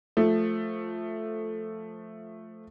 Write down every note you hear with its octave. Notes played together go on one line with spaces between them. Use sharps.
F3 A3